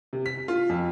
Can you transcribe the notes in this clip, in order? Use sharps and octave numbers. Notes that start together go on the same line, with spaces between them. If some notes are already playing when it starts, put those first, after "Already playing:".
C3
B6
F4
F2